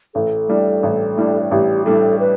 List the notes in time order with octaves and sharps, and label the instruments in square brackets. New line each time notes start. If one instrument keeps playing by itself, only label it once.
[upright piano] A1 [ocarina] A4
[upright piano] A2 G3 D4
A1
A2 G3 D4
[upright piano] A1 [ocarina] G4
[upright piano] A2 G3 D4 [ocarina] A4
[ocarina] B4